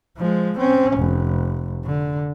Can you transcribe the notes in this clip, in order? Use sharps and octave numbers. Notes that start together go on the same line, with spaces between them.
F3 G#3
C4 C#4
F1
D3